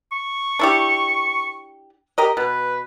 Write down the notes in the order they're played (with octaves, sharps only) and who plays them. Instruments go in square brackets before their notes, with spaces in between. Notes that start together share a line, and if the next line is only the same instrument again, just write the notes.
[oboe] C#6
[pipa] D4 E4 G4
G4 A#4 D#5
[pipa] B2 [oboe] B4